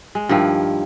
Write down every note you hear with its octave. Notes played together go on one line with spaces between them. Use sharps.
G#3
G2 D#3 F3 E4